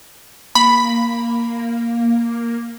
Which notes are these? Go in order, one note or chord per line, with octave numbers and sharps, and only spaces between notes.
A#3 B5